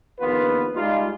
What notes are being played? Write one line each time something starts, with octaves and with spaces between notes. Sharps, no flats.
A#1 D#2 B3 F4 B4
G3 G#3 D#4 F4